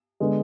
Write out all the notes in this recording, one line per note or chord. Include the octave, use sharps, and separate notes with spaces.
D3 G#3 B3